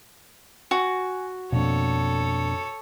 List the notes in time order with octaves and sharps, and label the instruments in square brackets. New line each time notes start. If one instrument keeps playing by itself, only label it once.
[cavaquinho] F#4 [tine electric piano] G#5
[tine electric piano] F2 D4 [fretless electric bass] B2 A#3 [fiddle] A4 C#5